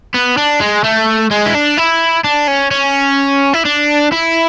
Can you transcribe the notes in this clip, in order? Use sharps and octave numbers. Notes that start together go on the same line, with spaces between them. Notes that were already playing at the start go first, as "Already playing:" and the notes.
B3
D4
G#3
A3
G#3
E4
D4
E4
D4
C#4
C#4
E4
D4
E4